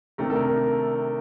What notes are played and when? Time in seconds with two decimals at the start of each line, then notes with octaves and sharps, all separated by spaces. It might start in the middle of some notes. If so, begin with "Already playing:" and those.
0.18 C3 D#3 A3 D4 A#4
0.30 A4
0.35 A#4